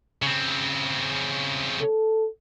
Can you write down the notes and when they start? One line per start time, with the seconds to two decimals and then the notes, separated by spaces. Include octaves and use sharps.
0.22 C#3 C4
1.81 A4